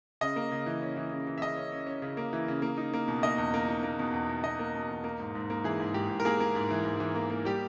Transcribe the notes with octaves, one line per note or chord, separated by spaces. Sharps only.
C#3 D#5
A#3
C#3
E3
C#4
E3
C#3
E3
E5
C#3 D#5
C#4
C#4
C#4
C#3
A#3
E3
C#3
A#3
D#4
A#3
B2
A#3 D#5
E2
A#3
D#4
A#3
B2
E2
B2
B2 D#5
A#3
B2
E2
A#3
G#2
G#2
A#3
E3 G#4
G#2
G#2 G4
G#2
A#4
A#3 G#4
A#3
G#2
E3
G#2
E3
A#3
A#3
G3 G4